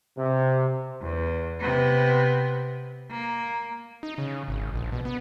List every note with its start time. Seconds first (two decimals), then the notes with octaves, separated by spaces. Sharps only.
0.18 C3
1.01 E2
1.60 C3 B3
3.10 A#3
4.03 D#4
4.18 C#3
4.48 G#1
4.74 A#1
4.92 B2
5.05 B3